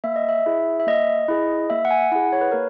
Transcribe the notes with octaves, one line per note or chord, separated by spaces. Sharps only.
A#3 E5
D#5
E5
E4 G#4
E5
A#3 D#5
E4 G#4
A#3 E5
F#5
G#5
E4 G#4 F#5
C#5
B4
A#3 A#4